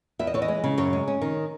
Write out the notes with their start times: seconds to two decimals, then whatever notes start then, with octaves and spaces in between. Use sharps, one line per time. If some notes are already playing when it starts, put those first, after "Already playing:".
0.19 E2 E5
0.27 D#5
0.34 E3 C#5
0.42 D#5
0.48 G#3
0.64 C#3
0.78 F#2 C#5
0.93 G#3
1.08 C#4
1.21 D#3